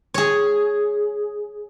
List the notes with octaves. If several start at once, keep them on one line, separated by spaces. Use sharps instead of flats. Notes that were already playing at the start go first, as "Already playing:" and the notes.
G#4 C#5